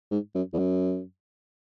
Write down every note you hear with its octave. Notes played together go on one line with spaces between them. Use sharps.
G#2
F#2
E2
F#2